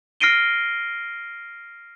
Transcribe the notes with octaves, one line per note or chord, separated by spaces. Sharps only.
F6 A#6 C7 D7 D#7 G7